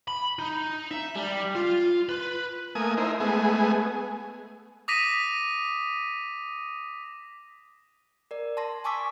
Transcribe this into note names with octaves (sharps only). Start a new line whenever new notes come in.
B5
D#4
E5
G3
F4
B4
A3 A#3 G#5 D#6
D#4 E4 A#4 C5
G#3 A3 B3 G#4
D6 D#6 A#6 B6 D#7
A#4 D5
A5 C6 A#6
G#5 A5 C#6 D6 E6 B6